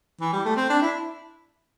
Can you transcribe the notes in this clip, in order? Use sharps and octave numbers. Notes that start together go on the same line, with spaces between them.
E3
G3
A3
C4
D4
E4